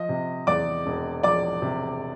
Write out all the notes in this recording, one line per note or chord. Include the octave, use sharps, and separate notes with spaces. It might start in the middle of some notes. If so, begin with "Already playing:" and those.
Already playing: F3 D#5
C3
E2 D5 D6
E1
F3 D5 D6
C3